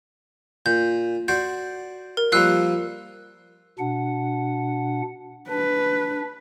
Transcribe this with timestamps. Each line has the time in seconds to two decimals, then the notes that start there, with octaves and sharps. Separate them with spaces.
0.66 A#2 G6
1.28 F#4 C5 D5 G6
2.17 A#4
2.32 F3 G3 A#3 E6 F#6 C7
3.79 B2 D4 F#5
5.50 D4 B4